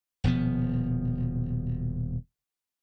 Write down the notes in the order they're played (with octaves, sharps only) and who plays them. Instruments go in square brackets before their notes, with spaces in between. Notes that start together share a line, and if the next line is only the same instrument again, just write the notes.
[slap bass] D#1 B2 F3 B3